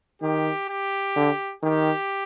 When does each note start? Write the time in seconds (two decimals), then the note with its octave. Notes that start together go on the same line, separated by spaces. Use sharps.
0.22 D#3 G4
0.69 G4
1.16 D3
1.63 D#3 G4